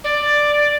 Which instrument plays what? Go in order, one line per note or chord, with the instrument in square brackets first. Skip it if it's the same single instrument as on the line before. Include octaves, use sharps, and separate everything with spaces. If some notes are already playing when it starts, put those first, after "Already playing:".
[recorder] D5